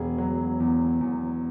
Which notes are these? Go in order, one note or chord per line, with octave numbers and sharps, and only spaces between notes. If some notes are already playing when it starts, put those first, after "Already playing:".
Already playing: E1 G#4
F#3
E2
E2